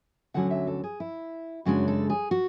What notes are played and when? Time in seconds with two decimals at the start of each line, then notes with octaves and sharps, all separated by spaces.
0.34 D2 D3 F#3 C#4 F#5
0.51 E5
0.67 A4
0.84 G#4
1.00 E4
1.65 F#2 C#3 G#3 D4 F#4
1.88 A4
2.10 G#4
2.31 F#4